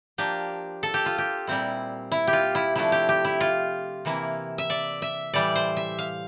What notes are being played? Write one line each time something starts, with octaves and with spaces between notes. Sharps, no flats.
F3 A#3 D4 G4
A4
G4
F4
G4
A#2 G3 C4 E4
E4
G4
F4
E4
C3 F3 A3 D4 E4
G4
G4
E4
F4
C3 E3 A#3 E4
E5
D5
E5
A2 E3 G3 D5
C5
E5
F5